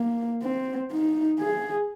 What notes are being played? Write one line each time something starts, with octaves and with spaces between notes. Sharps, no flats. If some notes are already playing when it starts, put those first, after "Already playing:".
Already playing: A#3
C4
D#4
G#4